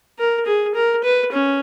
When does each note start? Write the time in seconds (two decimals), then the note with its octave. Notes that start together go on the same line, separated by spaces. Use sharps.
0.19 A#4
0.46 G#4
0.75 A#4
1.04 B4
1.32 C#4